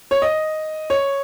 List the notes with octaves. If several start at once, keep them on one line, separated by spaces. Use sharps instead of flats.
C#5
D#5
C#5